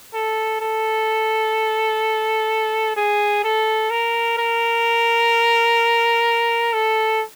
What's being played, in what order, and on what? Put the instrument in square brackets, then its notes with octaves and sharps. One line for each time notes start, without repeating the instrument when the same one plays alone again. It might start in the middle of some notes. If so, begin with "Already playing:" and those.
[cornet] A4
A4
G#4
A4
A#4
A#4
A4